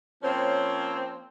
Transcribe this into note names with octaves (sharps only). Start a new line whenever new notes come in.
F3 A#3 C4 C#4 C5 C#5